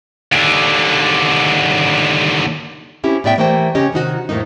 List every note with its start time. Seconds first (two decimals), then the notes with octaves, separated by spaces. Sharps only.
0.32 D#2 D3
3.04 C4 C#4 E4 G4
3.24 A2 B3 D5 E5 G5
3.38 E3 A3 A#3 G4 C5 G5
3.75 C#3 C#4 G4 D#5
3.92 C3 D#3 D#4 F#4
4.29 F2 A2 A3 A#3 D#4